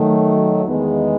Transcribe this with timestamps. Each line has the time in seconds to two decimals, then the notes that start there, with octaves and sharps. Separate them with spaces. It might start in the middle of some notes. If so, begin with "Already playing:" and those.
Already playing: D#3 F#3 A3
0.64 E2 D#3 G#3 B3